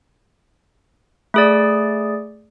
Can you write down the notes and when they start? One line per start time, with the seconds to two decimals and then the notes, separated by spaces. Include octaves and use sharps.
1.34 A3 G#4 D5